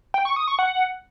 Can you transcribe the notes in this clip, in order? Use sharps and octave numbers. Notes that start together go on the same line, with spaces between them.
G5
C#6
D#6
C#6
F#5